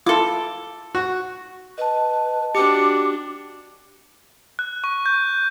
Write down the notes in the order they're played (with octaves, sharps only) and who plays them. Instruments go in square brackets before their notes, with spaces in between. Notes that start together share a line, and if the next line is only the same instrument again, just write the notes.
[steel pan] E4 F4 [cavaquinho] A4 D6
[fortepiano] F#4
[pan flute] B4 [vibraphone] D#5 A5
[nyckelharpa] D4 F#4 [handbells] G4 C#7 [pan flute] D6
[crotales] F#6
C#6
G6